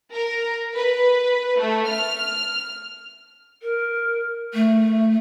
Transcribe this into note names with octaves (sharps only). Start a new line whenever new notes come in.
A#4
B4
A3
F6
A#4
A3